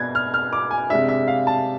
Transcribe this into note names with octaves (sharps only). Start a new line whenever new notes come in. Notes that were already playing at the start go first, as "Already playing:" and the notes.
Already playing: B2 B3 D4 G#6
F6
F6
D6
G#5
C3 G#3 D4 E5
E5
F5
A5